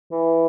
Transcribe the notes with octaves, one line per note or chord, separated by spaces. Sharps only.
E3